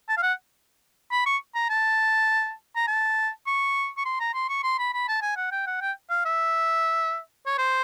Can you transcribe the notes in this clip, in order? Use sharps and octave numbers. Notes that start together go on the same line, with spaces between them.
A5
F5
F#5
B5
C#6
A#5
A5
A#5
A5
C#6
C#6
C6
A#5
C6
C#6
C6
B5
B5
A5
G#5
F#5
G5
F#5
G5
F5
E5
C#5
C5